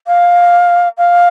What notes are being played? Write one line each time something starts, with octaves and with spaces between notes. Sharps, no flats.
F5
F5